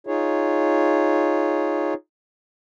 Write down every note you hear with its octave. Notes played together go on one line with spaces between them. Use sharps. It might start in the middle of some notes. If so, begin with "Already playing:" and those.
D#4 F4 G#4 C#5